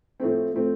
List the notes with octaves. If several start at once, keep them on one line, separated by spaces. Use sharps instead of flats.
A2 F3 A3 C4
A2 F3 A3 C4